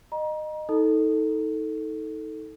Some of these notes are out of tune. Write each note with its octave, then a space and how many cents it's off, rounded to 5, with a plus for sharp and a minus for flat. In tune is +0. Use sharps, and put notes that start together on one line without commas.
D#5 -20 A#5 +30
D#4 +30 A4 +0